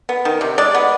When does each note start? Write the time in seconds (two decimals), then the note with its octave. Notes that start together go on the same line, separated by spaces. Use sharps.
0.09 B3
0.25 D#3
0.41 C3
0.58 G#3 D5
0.75 B3